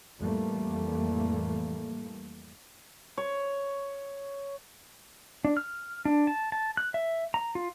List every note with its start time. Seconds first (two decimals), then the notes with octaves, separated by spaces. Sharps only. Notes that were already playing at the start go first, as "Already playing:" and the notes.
0.19 F2 A2 E3 G3 A3 A#3
3.18 C#5
5.45 D4
5.57 F6
6.05 D4
6.27 A5
6.52 A5
6.77 F#6
6.94 E5
7.34 A#5
7.55 F4